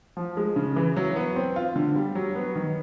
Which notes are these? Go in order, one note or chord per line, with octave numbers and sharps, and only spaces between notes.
F3
G#3
C#3
E3
F#3
B3
C4
F4
D3
G3
F#3
B3
D#3